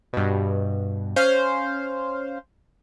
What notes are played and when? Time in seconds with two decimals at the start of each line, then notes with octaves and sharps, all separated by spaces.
0.13 G2 B2
1.16 C#4 C5 F5